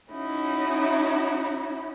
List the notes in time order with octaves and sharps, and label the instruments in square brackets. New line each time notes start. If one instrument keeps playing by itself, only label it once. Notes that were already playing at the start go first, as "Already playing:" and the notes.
[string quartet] C#4 D#4 E4 F#4